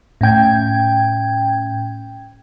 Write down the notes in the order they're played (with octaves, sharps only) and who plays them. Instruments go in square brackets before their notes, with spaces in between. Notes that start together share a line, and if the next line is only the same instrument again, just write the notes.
[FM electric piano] A2 C#4 G5 G#6